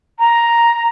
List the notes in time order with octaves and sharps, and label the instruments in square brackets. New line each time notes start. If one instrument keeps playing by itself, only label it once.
[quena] A#5